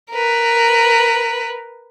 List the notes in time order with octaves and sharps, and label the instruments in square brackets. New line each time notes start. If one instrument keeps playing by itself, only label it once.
[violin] A#4 B4